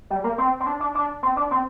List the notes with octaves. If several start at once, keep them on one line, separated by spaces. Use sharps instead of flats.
G3
A#3
C4
C4
D4
D4
D4
C4
D4
C4